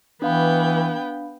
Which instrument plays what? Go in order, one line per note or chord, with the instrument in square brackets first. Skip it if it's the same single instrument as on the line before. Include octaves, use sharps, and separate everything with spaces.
[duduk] E3 [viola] B3 G5 [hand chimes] D4 F5 B5